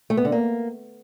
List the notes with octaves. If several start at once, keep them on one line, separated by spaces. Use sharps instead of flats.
A3
B3
D3
A#3